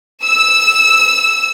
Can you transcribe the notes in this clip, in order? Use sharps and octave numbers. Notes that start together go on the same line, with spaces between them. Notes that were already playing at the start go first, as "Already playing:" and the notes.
E6